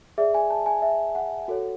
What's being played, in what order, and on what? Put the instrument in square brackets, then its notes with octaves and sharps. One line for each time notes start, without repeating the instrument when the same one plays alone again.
[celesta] G#4 D5 E5
G#5
A5
G#5
E5
F#5
F#4 A4 C#5